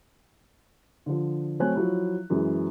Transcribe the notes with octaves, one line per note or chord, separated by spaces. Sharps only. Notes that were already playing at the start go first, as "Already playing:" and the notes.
D3 F3
F#3 A3 C4 C#5 G#5 F#6
F3 F#3 E4
F#2 E3 G#3